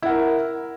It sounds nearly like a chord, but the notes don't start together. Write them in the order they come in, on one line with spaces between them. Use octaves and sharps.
E4 F#5 A#4